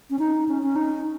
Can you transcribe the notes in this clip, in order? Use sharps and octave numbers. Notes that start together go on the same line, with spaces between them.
C#4
D#4
C#4
C#4
D#4